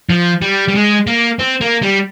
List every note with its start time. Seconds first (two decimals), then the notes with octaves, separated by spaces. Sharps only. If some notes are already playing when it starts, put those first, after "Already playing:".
0.10 F3
0.42 G3
0.68 G3
0.75 G#3
1.07 A#3
1.39 C4
1.61 A#3
1.83 G3